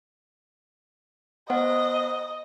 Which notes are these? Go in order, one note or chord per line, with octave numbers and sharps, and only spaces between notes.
B3 C5 D#5 F#5